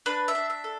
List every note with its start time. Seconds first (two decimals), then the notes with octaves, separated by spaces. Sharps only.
0.06 D4 B4
0.28 E5
0.35 D4
0.50 E5
0.64 A4